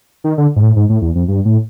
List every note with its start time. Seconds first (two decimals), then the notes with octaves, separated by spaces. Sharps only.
0.24 D#3
0.38 D3
0.56 G#2
0.63 A2
0.76 G#2
0.89 A2
1.02 E2
1.15 F2
1.28 G2
1.45 A2